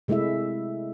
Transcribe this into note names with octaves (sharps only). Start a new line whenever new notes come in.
C3 G#3 A3 E4 E5